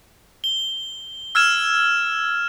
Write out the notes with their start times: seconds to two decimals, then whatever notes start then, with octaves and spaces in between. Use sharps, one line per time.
0.44 G7
1.35 E6 F6 G#6 E7